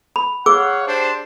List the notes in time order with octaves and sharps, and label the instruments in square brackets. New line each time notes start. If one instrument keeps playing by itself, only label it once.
[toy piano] B5
[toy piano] G#4 D6 E6 [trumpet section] C#5 F5 F#5
[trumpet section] D4 G4 C5